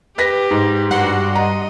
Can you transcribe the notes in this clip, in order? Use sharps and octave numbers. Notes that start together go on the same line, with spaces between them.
G4 B4 A#6 B6
G#2
G2 G3 F#4 F#5 C6
D#5 A#5